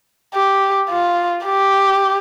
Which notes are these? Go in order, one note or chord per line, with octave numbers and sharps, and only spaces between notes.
G4
F4
G4